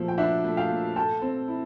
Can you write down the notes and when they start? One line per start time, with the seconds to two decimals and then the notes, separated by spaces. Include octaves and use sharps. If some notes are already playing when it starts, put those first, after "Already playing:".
Already playing: A#2 F3 A3
0.08 G5
0.18 D4 E5 F#5
0.44 A3
0.57 F5 G5
0.70 A#2
0.96 A4 G5 A5
1.22 C4
1.48 E4